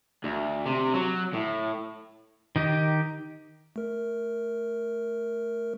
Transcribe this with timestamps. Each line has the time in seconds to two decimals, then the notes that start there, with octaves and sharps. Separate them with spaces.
0.24 D2
0.66 C3
0.94 F#3
1.34 A2
2.56 D#3 D#4 G4
3.76 A3 A#4